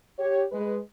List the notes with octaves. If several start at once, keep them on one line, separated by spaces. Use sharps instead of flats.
G4 C#5
G#3 B4